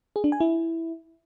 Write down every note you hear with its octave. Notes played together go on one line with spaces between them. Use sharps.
G#4
D4
G#5
E4